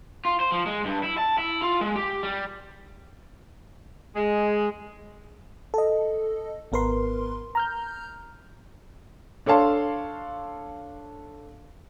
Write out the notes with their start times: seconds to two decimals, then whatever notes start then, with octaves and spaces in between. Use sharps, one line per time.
0.25 F4
0.40 C5
0.52 F3
0.66 G#3
0.85 G2
1.03 E4
1.18 A5
1.38 E4
1.62 F4
1.81 G#3
1.96 G4
2.23 G3
4.15 G#3
5.74 A4 D#5
6.72 G#1 B3 A#4 B4 C6
7.55 A#5 F6 G6
9.46 D4 A4 C#5 F5 A5 C6